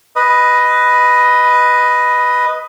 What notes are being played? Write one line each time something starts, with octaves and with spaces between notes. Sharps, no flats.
B4 D#5